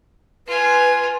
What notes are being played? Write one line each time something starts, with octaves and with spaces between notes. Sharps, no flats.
F4 B4 G#5